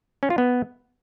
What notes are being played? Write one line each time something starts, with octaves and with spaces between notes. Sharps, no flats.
C#4
F4
B3